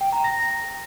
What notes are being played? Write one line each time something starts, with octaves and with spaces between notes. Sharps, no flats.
G5
A#5
A#6